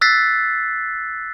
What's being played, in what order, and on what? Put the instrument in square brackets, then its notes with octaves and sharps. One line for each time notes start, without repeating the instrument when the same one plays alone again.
[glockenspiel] E6 F#6 A6 B6 C7